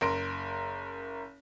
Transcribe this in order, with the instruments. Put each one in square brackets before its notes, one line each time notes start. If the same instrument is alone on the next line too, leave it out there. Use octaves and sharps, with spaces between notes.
[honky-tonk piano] F#1 A#4 C6 A#6 D7